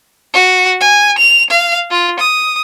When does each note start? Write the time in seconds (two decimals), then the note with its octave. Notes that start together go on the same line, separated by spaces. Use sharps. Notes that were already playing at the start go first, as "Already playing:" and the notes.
0.34 F#4
0.81 G#5
1.19 F7
1.50 F5
1.91 F4
2.20 D#6